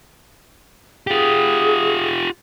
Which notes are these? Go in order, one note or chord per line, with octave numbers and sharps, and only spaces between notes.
F4 G4 G#4